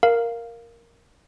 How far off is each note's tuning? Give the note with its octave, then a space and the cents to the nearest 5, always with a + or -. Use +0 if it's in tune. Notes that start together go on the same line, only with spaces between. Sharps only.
A#4 +0 F5 +0